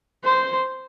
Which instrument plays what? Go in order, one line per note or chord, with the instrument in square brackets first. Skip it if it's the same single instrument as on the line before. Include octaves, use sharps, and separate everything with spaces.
[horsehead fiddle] C5